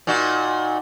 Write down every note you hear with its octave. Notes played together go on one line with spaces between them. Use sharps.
A#2 D#4 F#4